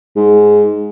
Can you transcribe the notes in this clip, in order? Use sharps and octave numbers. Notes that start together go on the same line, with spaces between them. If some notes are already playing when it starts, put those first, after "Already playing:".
G#2